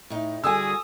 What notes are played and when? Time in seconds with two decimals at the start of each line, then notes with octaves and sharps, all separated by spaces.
0.10 A2 D#4
0.44 D3 G3 F#4 G#4 G#5 D#6 E6